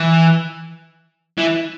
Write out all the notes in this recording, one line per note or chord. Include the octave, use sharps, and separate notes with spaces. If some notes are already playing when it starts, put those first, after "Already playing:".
Already playing: E3
E3